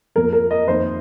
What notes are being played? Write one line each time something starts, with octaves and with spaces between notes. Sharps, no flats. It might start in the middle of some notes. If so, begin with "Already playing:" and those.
F2 F3 A#3 A#4
A#4
D#5
F2 D#3 A#3 C5